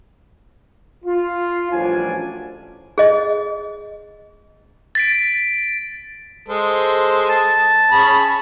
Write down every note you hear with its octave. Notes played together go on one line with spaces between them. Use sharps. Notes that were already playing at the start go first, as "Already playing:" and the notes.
F4
A1 F#2 F3 G3 D4 G#5
G#4 D#5
A6 B6 D7
G#3 A4 C5
A5
C#4 G#4 B5